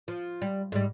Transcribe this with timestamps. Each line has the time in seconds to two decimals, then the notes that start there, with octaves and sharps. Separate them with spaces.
0.08 F3
0.42 G3
0.72 G#2 G3